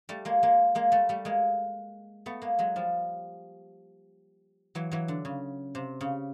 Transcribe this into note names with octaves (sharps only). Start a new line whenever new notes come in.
G3 A3
G#3 A#3
G#3 A#3
G#3 A#3
G3 A3
G3 A3
G#3 A#3
A3 B3
G#3 A#3
F#3 G#3
F3 G3
E3 F#3
E3 F#3
D3
C#3
C3
C#3